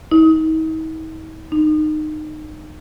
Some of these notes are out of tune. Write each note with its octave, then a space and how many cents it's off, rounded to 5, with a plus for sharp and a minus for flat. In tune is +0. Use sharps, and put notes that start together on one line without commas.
D#4 +40
D#4 -20